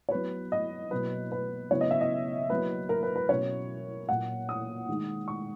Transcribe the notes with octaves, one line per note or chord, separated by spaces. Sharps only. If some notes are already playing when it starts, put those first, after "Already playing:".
C#5
F#3 B3 E4 B4
D#5
B2 F#3 A#3 E4 B4
B4
C#3 F#3 B3 E4 C#5
D#5
E5
D#5
F#3 A#3 E4 B4
A#4
B4
B4
B2 F#3 C#4 E4 C#5
A#2 F#3 A#3 F#5
D#6
D#3 G#3 D#4
C#6